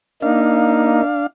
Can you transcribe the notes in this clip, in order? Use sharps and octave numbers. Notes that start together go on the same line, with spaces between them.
A#3 D4 D#4 F5